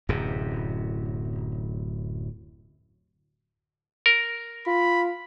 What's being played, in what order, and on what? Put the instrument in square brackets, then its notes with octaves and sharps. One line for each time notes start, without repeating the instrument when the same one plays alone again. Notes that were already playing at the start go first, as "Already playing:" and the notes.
[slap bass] D1 F#2 C3
[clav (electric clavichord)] A#4
[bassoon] F4 [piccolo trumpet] B5